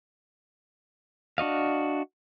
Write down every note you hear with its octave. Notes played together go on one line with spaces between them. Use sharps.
D4 F#4 D#5 F5